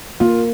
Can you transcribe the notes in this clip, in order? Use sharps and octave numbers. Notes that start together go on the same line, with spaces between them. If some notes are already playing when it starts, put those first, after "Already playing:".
A#3 F4